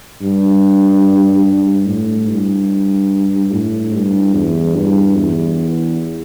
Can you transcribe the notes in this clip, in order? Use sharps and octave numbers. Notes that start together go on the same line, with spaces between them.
G2
G2
A2
G2
A2
G2
E2
G2
E2